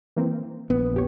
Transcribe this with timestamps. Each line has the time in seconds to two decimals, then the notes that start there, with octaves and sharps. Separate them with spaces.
0.16 E3 A#3 C4
0.70 A#1 B3
0.94 F2 G4 C#5